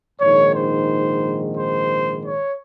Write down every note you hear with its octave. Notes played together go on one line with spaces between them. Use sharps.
A#1 G#2 D#3 C#5
C5
C5
C#5